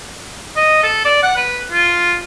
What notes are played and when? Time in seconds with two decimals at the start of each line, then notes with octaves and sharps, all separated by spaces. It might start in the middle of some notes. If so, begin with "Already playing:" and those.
0.56 D#5
0.83 A4
1.05 D5
1.23 F#5
1.36 B4
1.72 F4